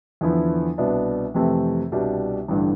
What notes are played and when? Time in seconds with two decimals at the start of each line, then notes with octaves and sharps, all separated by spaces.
0.21 E2 D3 F3 B3 E4
0.78 C2 B2 B3 D4
1.34 F2 C3 E3 A3 C4
1.92 C2 B2 G3 D4
2.48 A1 G2 D3